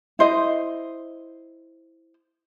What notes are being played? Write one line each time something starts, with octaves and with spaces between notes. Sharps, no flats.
E4 C5 D#5